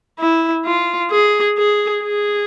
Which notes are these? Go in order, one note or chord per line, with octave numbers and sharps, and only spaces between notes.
E4
F4
G#4
G#4
G#4